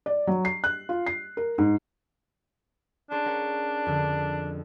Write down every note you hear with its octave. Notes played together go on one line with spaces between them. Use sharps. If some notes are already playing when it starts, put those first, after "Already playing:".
D5
F#3
C7
F#6
F4
C7
A#4
G#2
C#4 D4 G#4 C5
C#4 A#4 F#5
F2 D3